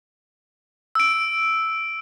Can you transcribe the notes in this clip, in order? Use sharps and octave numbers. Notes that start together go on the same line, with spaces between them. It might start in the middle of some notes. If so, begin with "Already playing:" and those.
E6 D7